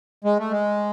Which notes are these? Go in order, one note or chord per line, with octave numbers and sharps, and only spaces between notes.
G#3
A3
G#3